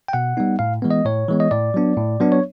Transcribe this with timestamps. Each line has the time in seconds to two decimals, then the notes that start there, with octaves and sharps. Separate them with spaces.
0.08 G5
0.13 B2 F#5
0.37 G3 B3 D#4
0.59 A2 F5
0.82 E3 G#3 B3
0.91 D#5
1.05 A2 C#5
1.28 E3 G#3 B3
1.40 D#5
1.51 A2 D5
1.74 F#3 B3 D4
1.97 A2
2.20 F#3 B3 D4
2.32 C#5